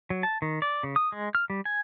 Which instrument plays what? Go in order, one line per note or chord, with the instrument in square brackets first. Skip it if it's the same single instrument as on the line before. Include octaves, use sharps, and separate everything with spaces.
[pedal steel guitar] F#3
A5
D#3
D5
C#3
D#6
G#3
F6
G3
G#5